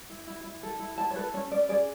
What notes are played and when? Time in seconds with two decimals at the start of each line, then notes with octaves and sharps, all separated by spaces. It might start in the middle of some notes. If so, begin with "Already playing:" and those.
0.10 E4
0.27 E4
0.44 E4
0.63 A4
0.80 E4
0.98 E4 A5
1.10 C#5
1.16 A4 B4
1.34 C#4 C#5
1.51 C#4 D5
1.69 G#4 D5